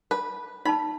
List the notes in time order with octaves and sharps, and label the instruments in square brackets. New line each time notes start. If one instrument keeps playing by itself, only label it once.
[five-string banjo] B4
[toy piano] D#4 A5 [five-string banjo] B5